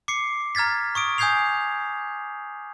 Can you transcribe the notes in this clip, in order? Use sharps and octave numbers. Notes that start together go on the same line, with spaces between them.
D6 C7 C#7
A#5 F6 G#6 A6 B6
C#6 D#6 D7
G#5 D#6 G6 G#6 C7 F7